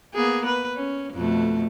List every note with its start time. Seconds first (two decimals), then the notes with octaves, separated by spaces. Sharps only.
0.14 A#3 B3 G#4
0.46 B4
0.76 C#4
1.14 F2 B2 A3